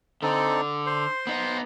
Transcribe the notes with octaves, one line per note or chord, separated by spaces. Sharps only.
D3 C4 D#4 A4
C5 C6
B3 D#4